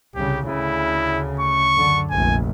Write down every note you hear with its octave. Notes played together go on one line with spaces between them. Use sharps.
C2 C#3 G4
D2 C#3 E4
C#6
F#2 D3
F1 A#1 G#5